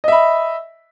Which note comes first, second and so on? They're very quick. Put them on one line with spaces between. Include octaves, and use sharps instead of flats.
D#5 E5 B5